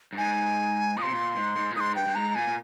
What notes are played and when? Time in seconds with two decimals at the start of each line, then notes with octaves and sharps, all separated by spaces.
0.13 G2
0.18 G#2 G#5
0.97 A#2 D#6
1.02 C3 C6
1.11 A#2
1.36 G#2
1.56 G#2
1.71 A#2
1.76 G#2 D#6
1.80 C6
1.96 G2 G5
2.06 G2
2.15 G#2 A#5
2.35 A#2 G#5
2.47 A#2